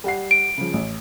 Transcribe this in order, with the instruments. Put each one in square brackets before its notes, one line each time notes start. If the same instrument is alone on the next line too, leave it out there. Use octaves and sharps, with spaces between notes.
[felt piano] G3 F#5 C7
[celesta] D7
[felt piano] C#3 F3
A1